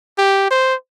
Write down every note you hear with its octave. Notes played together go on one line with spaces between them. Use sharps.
G4
C5